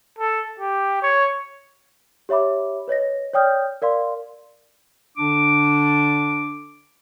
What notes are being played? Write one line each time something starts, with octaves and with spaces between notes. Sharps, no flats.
A4
G4
C#5
G4 C#5 E5 B5 D6
B4 C#5 D#5 A#6
C#5 D5 G5 D#6 F6 G6
A#4 D5 F5 C6
D3 D4 D6